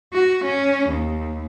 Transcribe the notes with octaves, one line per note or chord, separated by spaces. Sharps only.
F#4
C#4
D#2